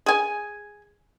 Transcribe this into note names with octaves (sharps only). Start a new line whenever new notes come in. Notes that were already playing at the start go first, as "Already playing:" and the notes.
G#4 G#5